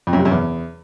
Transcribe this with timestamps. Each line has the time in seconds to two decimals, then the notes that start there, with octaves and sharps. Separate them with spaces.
0.07 F2
0.13 F#2
0.19 C3
0.25 F#2
0.31 E2